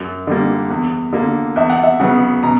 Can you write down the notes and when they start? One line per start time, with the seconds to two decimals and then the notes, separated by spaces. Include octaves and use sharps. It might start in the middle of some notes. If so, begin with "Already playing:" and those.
Already playing: F#2
0.27 D3 G3 A#3
0.70 E2
1.13 D3 A#3
1.56 E2 E5
1.70 F#5
1.84 E5
2.00 C#3 F#3 B3 F#5
2.43 B2 A#5